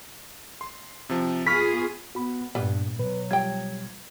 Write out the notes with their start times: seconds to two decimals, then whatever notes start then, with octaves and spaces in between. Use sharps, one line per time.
0.61 C6
1.10 C3 F3
1.46 B3 F4 G#4 B5 C#6 F6 B6
2.15 B3 F#4 B5
2.55 G2 A#2 G3 B3
2.99 B2 F#3 B4
3.31 F3 G3 G5 G#6